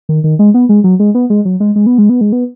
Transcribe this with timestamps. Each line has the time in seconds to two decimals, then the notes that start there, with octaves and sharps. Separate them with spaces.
0.09 D#3
0.24 D#3
0.39 G#3
0.54 B3
0.69 G#3
0.84 F#3
1.00 G#3
1.15 B3
1.30 G#3
1.45 F#3
1.60 G#3
1.76 G#3
1.86 B3
1.98 G#3
2.09 B3
2.21 G#3
2.32 B3